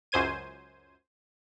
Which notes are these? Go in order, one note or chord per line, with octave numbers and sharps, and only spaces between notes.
C#2 F#2 C5 G#6 D#7